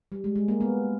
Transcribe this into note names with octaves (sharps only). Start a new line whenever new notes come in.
G3
G#3
G#3
A#3
B3